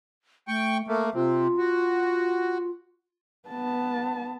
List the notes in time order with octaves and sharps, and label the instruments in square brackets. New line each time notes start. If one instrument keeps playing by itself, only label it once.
[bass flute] A3 [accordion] G5 C#6
[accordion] A3 A#3 [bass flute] A4
[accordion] C3 C4 [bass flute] F4
[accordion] F#4
[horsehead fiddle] B3 A5